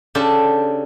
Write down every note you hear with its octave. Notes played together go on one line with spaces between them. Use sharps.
C#3 D4 G4 A4 C5